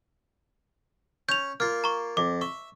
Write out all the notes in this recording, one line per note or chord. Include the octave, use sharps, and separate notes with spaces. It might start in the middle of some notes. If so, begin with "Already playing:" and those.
C#4 G6 F7
A#3 F4 F6
A#5 C#6
F2 D6
E5 C#6